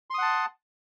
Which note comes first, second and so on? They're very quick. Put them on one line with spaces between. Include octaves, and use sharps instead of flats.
C6 D#6 F#5 A5